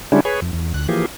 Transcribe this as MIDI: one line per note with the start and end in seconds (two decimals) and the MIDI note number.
0.12 0.20 50
0.12 0.20 55
0.12 0.20 56
0.12 0.20 61
0.12 0.20 62
0.12 0.20 64
0.25 0.40 68
0.25 0.40 71
0.25 0.40 73
0.42 0.51 41
0.53 0.73 40
0.74 0.87 38
0.74 0.87 90
0.88 1.06 52
0.88 1.06 53
0.88 1.06 58
0.88 1.06 67
0.88 1.06 68